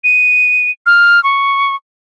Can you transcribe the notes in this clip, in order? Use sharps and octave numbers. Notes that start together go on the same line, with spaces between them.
D#7
F6
C#6